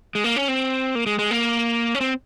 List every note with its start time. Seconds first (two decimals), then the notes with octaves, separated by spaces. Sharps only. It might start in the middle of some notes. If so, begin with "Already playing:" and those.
0.15 G#3
0.24 A#3
0.36 C#4
0.48 C4
0.95 A#3
1.06 G#3
1.19 G#3
1.31 A#3
1.95 C#4
2.01 C4